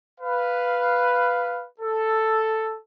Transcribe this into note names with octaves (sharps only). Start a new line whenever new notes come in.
B4 F5
A4